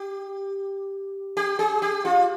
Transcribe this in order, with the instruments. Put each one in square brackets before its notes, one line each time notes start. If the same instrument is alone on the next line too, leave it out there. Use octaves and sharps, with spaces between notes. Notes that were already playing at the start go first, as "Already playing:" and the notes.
Already playing: [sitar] G4
G4
G#4
G4
F4